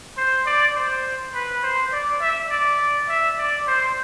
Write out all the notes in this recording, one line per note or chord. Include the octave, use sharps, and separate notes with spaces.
C5
D5
C5
B4
C5
D5
E5
D5
E5
D5
C5